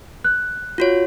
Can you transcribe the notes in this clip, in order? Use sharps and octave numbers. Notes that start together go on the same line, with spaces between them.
F#6
F4 F#4 C#5